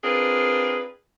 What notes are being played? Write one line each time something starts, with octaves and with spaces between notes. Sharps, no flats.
C4 D4 F4 G#4 A#4 B4